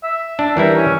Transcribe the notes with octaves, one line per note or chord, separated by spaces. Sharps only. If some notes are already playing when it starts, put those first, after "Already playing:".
E5
D4
E3 G3 E4 A#4
C#4